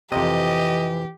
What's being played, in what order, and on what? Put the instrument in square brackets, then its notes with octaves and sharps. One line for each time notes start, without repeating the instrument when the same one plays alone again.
[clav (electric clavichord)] F2 C3 [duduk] E3 [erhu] G4 [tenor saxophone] D#5